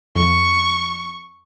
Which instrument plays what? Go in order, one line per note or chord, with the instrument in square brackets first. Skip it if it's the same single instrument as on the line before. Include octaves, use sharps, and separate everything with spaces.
[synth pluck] F2 [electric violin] C#6